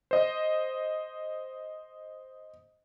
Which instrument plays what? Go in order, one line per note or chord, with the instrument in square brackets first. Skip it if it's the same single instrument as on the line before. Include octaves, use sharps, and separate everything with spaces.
[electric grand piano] C5 D#5